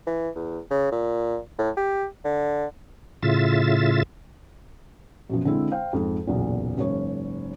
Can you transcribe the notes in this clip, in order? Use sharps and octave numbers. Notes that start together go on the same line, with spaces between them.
E3
E2
C#3
A#2
A2
G4
D3
A2 C#3 F4 E5 A6
F#2 B2 F3
D3 G#3 C4 E4
C5 F5 G5
F2 G#2 D#4
F#1 B1 E2 A#2
F#1 G#2 C#5